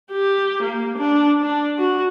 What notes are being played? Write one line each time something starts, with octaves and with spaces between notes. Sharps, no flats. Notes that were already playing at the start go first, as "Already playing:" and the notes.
G4
A#3
D4
D4
F#4